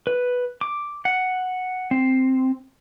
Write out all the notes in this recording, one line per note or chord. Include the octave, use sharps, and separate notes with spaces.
B4
D6
F#5
C4